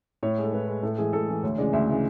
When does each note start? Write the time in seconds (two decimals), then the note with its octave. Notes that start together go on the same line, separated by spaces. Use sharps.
0.23 A2 C#5
0.38 G#3
0.44 A4
0.53 A2 B4
0.68 G#3
0.83 A2 A4
0.98 E3 G#3 G#4
1.13 A2 A4
1.28 E3 G#3
1.43 D2 C#5
1.58 C#3 E3 G#3 D5
1.73 D2 E5
1.88 C#3 E3 G#3